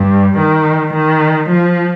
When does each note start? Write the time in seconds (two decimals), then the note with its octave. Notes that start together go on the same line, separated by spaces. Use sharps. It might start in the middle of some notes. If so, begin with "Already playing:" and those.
Already playing: G2
0.37 D#3
0.93 D#3
1.49 F3